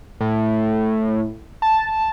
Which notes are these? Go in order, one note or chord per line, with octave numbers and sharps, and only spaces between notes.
A2
A5